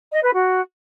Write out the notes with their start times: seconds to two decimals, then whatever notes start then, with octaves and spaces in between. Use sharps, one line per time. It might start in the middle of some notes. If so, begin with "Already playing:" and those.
0.12 D#5
0.23 B4
0.34 F#4